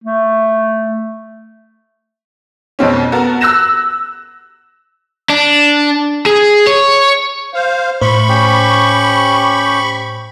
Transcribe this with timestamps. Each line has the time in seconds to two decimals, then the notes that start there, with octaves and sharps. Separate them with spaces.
0.04 A3
2.79 F2 B2 C4 C#4
3.12 B3 F#4 A4 A#4
3.41 E6 F#6 A#6 E7
5.29 D4
6.26 G#4
6.67 C#5
7.54 C5 F5
8.01 A2 C5 B5 C#6
8.29 C#4 G4